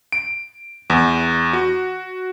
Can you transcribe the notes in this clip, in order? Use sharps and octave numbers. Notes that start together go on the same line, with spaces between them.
D7
E2
F#4